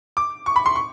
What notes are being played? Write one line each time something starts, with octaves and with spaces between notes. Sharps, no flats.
D6
C#6
B5
C6
C#6